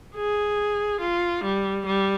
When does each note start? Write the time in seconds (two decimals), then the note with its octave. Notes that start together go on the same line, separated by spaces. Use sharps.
0.16 G#4
1.01 F4
1.44 G3
1.86 G3